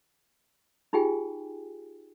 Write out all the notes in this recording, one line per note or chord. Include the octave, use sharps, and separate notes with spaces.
D#4 F4 G4 G#4 G5 G#5